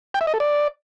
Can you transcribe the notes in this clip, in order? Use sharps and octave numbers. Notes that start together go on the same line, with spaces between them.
G5
E5
D#5
A4
D5